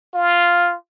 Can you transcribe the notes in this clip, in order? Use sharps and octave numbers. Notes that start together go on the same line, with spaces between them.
F4